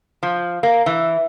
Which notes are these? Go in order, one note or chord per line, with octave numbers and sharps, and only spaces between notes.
F3
A#3
E3